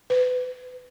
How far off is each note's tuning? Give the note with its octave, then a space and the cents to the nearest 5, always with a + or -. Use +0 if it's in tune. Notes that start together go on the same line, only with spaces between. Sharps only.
B4 +30